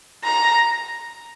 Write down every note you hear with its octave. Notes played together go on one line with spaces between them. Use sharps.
A#5